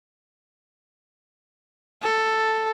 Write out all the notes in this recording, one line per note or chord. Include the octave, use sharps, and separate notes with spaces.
A4